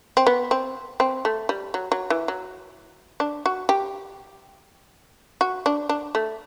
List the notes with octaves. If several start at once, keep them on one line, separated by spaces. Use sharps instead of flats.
C4
B3
C4
C4
A3
G3
F#3
F#3
E3
F#3
D4
F#4
G4
F#4
D4
D4
A3